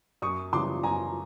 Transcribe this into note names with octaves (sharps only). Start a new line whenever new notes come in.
F#2 C#6 D#6
C#3 E3 G3 C6 D6
F#2 G#5 A#5